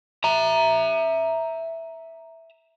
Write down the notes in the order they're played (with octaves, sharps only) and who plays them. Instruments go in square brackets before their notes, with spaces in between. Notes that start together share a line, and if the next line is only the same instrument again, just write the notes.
[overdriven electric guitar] E5 A#5